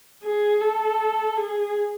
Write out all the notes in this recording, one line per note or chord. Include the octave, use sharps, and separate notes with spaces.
G#4
A4
G#4